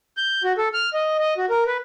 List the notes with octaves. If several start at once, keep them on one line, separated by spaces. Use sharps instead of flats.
G6
F#4
A4
F6
D#5
D#5
F#4
A#4
B4